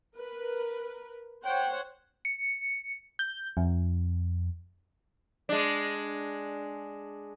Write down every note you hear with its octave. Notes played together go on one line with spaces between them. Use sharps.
A#4 B4
C5 C#5 F#5 G5
C#7
G6
F2
G#3 D4